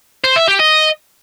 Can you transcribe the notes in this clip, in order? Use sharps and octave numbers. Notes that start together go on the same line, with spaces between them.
C5
E5
G4
D#5